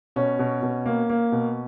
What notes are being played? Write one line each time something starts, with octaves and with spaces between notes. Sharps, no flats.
B2 C#4
B2
B2
A#3
A#3
B2